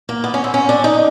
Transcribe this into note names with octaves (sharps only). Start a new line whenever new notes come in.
A#3
B3
C#4
C4
C#4
D4
D#4